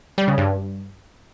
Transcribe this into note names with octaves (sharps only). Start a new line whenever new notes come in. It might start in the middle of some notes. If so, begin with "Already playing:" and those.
G3
C#3
G2